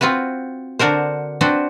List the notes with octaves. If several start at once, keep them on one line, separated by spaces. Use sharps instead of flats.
C4 F4 F#4 B4
D3 D4 F#4 A#4 C5
C4 D4 F#4 B4 C5